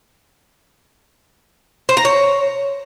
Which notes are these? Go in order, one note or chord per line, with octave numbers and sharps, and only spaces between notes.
C5
A#5
C#5